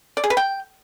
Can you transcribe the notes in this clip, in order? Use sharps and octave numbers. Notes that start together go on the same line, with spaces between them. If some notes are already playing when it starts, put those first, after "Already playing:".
D5
G#4
B4
G5